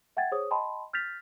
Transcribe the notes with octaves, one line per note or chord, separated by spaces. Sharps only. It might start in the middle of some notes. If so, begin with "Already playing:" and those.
E5 F#5 G5 G#6 A6
G#4 C5 C#5 D#6
D#5 G5 A5 B5 C6
F6 G6 A6 B6 F7